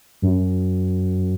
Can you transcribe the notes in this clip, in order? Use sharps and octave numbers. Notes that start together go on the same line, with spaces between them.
F#2